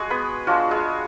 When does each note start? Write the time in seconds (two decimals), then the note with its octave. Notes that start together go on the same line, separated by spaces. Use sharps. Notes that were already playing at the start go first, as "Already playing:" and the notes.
Already playing: G#3 F#4 G#4
0.10 B3 B4
0.47 G#3 D4 F4 F#4
0.71 G#3 G#4